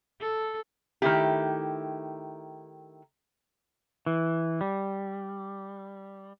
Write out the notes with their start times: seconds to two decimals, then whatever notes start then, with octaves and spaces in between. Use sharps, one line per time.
0.20 A4
1.02 D#3 A3 E4 G4
4.06 E3
4.61 G3